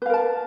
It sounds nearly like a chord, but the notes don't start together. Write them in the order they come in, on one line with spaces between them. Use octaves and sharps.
B4 F5 A#4 A5